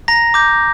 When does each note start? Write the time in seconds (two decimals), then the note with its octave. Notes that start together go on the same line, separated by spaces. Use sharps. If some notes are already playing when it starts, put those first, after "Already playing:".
0.08 A#5 A#6
0.34 D6 G6